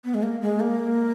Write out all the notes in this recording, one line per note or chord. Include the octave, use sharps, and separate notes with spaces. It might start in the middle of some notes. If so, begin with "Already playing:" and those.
B3
G#3
A#3
G#3
A#3